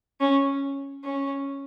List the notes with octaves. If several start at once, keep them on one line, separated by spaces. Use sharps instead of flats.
C#4
C#4